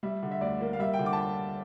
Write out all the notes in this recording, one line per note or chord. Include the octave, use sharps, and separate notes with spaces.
G3 E5
D3
E5
D2 D5
A#3
F5
G3 E5
G5
D3
D6
A5